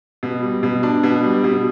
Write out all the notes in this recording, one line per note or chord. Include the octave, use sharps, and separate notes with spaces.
B2
G3
B2
D4
B2
G3
B2